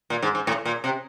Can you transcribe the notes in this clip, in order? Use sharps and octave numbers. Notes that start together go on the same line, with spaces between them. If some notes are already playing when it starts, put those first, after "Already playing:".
A#2
G#2
G#2
A2
A#2
C3